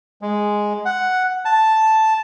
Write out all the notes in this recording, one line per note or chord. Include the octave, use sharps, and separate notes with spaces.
G#3
F#5
A5